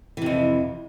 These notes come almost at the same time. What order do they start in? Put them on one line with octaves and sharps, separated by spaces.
E3 C3 F2